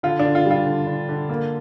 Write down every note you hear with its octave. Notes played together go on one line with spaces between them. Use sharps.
D3 F4
D3 D4
F4
G3
F4
D3
D3
D3
A#3